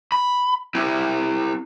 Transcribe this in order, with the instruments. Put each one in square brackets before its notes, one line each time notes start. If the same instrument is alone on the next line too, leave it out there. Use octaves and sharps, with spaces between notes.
[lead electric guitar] B5
C4 E4